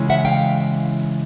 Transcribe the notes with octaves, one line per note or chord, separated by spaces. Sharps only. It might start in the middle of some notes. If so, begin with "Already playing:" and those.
Already playing: C#3 E3 G#3
E5 F#5
F5 G5